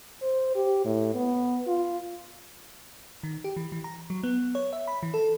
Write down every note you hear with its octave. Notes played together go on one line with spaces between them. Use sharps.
C5
G4
A2
B3
F4
D#3
G4
E3
E3
A#5
F#3
B3
C#5
E5
B5
E3
A4